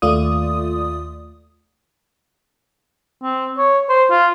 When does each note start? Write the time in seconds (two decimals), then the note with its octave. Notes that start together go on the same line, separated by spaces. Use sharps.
0.02 D#2 A3 F4 D5 D#6
3.22 C4
3.58 C#5
3.89 C5
4.11 F4